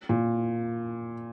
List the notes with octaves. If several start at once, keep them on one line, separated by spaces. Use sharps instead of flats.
A#2